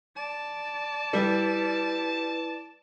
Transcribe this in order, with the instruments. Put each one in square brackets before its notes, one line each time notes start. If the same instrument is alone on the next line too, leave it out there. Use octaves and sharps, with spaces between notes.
[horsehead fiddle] D5 [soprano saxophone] A5
[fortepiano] G3 [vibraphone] E4 B4